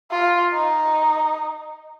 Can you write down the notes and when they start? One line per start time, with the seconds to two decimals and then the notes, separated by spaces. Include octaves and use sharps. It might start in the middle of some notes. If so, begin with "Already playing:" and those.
0.11 F4
0.54 D#4